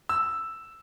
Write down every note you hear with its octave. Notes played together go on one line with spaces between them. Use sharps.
E6